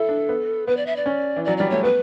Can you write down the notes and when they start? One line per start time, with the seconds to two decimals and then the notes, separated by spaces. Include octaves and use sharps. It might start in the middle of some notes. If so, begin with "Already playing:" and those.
Already playing: E4 A4
0.09 D4
0.29 B3
0.67 B3 B4
0.77 D5
0.86 E5
0.96 D5
1.06 C#4
1.36 E3
1.45 F#3 D5
1.57 G3 D5
1.70 A3 C#5
1.83 B3 B4